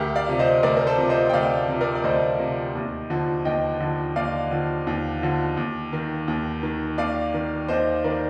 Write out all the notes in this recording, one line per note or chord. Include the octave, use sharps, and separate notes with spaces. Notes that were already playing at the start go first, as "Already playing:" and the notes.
Already playing: D2 G4 A#4
D5 F5
C3 F3
C5 D#5
D2 A#4 D5
A#4
A4 C5
C3 F3
C5 D#5
G5
D2 D5 F5
C3 F3
A#4 D5
D5
D2 C5 D#5
C3 F3
D#2
D3 F3
D#2 D#5 G5
D3 F3
D#2 D5 F5
D3 F3
D#2
D3 F3
D#2
D#3
D#2
D#3
D#2 D5 F5
D#3
D#2 C5 D#5
D#3 A#4 D5